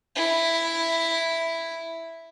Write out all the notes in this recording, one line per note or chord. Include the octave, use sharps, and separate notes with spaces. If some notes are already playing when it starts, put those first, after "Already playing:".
E4